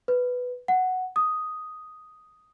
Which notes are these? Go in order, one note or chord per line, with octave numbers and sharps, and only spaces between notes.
B4
F#5
D#6